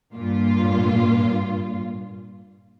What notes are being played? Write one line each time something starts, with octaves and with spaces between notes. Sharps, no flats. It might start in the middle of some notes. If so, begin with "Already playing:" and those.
G2 A#2 F4